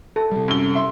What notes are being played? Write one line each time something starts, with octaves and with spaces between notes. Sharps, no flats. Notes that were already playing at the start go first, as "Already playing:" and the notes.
A4
C3 G3
F#2 G7
E5 C6